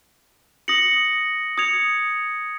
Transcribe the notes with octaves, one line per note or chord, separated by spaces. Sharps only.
D#6 A#6 C#7 F#7
D#6 G#6 C#7 F7